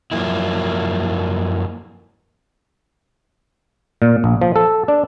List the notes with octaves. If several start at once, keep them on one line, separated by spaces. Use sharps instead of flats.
F#2 F3 F#3 A#3 E4
A#2
A#1
F3
A4
D4